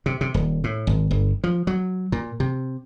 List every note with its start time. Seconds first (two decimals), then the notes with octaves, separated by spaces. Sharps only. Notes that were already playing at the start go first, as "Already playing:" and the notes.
0.06 C3
0.21 C3
0.34 D#1
0.64 A2
0.87 G#1
1.11 G1
1.44 F3
1.67 F#3
2.12 A#2
2.40 C3